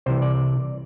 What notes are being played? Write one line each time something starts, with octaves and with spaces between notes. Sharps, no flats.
C2 C3 E3 C5
D5